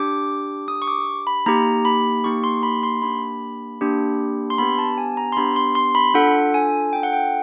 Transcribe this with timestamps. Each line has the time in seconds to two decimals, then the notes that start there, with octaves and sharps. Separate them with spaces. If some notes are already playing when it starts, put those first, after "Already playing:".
Already playing: D4 G4 D6
0.68 D4 G4 D#6
0.82 C#6
0.88 D6
1.27 B5
1.46 A#3 D#4 G4 A#5
1.85 B5
2.24 A#3 D#4 G4 C#6
2.44 C6
2.63 B5
2.83 C6
3.02 A#3 D4 G4 B5
3.81 A#3 D4 G4
4.50 C6
4.58 B3 D4 G4 B5
4.78 A5
4.98 G#5
5.17 A#5
5.32 C6
5.37 B3 D4 G4 B5
5.56 C6
5.75 C6
5.95 B5
6.14 D4 F4 A4 F#5
6.54 G#5
6.93 D4 F4 A4 G5
7.03 F#5
7.13 G5